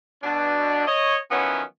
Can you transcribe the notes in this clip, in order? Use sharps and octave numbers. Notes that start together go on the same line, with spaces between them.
B2 D4
C#5 D#5
D#3 F3 F#3 B3 C#4 E4